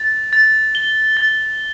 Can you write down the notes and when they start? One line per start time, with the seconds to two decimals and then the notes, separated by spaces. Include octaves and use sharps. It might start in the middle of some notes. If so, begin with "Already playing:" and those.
Already playing: A6
0.33 A6
0.75 G7
1.17 A6